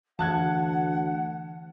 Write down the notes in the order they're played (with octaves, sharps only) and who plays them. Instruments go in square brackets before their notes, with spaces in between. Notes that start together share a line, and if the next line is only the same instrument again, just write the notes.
[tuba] D2 [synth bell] E3 [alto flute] F#5 [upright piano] A5 F#6 G#6